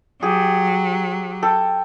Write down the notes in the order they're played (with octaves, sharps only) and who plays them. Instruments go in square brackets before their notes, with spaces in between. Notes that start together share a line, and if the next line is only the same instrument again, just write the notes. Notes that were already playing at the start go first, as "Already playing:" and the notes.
[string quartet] F#3 [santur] G4 G#4
[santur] A4 G5